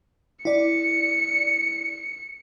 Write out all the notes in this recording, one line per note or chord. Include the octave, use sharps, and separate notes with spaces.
E4 D5 C#7